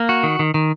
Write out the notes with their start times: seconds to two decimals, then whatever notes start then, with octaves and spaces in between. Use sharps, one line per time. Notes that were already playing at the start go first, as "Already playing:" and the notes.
Already playing: A#3
0.09 F#4
0.23 D#3
0.39 D#3
0.54 D#3